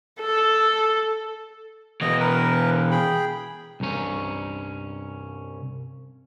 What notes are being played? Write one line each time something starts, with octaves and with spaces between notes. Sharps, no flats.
A4
B2 E3 D#5
A#4 B4
G#4 G5 B5
C2 G2 C#4